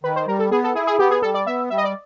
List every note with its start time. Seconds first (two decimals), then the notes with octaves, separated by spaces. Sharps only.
0.04 D#3 B4
0.16 C5
0.27 G3 A#4
0.39 A4
0.51 B3 G#4
0.64 A4
0.75 E4 G#4
0.87 G#4
0.99 B3 G4
1.11 G#4
1.22 G3 A4
1.34 D5
1.46 B3 E5
1.70 G3 E5
1.77 D#5
1.84 D5